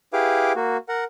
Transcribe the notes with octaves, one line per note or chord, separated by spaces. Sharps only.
E4 G4 G#4 B4 F5 D6
A#3 F#4
A#4 F#5